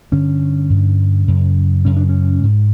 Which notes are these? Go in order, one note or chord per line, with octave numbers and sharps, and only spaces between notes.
G2 D3 C#4
G2 D3
F#2 C#3
F#2 C#3 C#4
D4
C#4
G#2